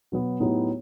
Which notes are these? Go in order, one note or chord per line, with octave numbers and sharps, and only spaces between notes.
B2 F#3 B3
A2 F#3 B3 D#4 G4